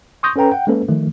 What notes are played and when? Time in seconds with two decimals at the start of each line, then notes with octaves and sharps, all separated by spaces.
0.23 C6 C#6 D#6 G6 A#6
0.36 C#4 A4 B4 G5 A#5
0.52 F#5 G5
0.67 G#3 A#3 C#4 A4 B4
0.88 D#3 F3 A3